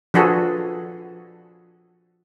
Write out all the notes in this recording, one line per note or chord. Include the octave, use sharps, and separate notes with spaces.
F3 D4 F#4 G#4 A4 B4